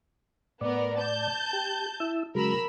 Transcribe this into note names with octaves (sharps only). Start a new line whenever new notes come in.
A2 B3 A#4 D5
A5 G6
G4
E4 E6
C#3 F#3 G#3 A#4 B5 E6